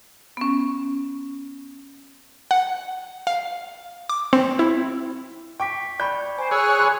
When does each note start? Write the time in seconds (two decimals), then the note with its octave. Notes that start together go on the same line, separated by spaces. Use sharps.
0.37 B3 C#4
2.51 F#5
3.27 F5
4.09 D6
4.33 C4
4.59 E4
5.60 G5 C#6 D6 B6
6.00 D5 B5 C#6 G6
6.39 C5 G#5
6.51 G#4 C#5 E6 F#6
6.79 B5 C6